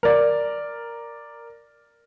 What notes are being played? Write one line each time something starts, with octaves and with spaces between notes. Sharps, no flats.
A#4 D5